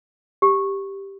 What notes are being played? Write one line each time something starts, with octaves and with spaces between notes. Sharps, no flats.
G4